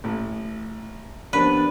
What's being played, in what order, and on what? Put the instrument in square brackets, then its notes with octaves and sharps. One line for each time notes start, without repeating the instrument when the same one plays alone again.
[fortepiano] A1 A2
[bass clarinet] F3 [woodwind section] G3 B3 D4 [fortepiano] C#4 A#4 B5 [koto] B4